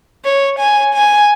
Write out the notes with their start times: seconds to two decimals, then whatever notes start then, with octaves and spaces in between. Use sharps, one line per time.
0.25 C#5
0.59 G#5
0.94 G#5